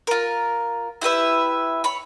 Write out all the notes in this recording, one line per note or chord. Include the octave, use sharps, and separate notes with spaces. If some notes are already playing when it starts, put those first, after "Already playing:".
F4 A#4
E4 G4 B4 E5
C#5 B5